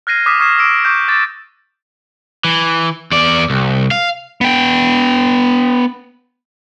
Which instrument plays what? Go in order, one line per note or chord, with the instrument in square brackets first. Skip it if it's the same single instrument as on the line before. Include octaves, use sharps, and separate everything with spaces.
[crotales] F6 F#6 G#6 A#6 C7 D#7
D6 D#6 F6 F#6 B6 E7
C#6 D#6 F6 G#6 C7 E7
D6 E6 D7
C#6 D6 G6
D6 A6
[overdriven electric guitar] E3
E2 D5
C2
F5
[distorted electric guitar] B3 G5